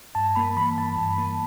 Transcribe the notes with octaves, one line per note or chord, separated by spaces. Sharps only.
G2 A5
A#3 B5
E3 B5
G2 A5
G2
A#3